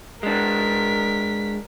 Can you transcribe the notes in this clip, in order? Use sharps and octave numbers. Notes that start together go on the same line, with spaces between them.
G#3 D4 A#4 B6